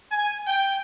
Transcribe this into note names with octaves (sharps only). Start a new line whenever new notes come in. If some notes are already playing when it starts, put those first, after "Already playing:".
G#5
G5